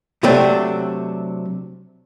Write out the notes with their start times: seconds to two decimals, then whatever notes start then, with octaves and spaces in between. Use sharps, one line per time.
0.23 C3 F#3 A3 C4 D4